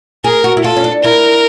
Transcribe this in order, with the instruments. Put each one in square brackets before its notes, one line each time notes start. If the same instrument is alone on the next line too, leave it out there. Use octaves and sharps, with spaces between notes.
[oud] G#4 [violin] A#4
[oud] F#4
E4
[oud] F4 [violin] A4
[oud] C#4
D4
[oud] E4 [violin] A#4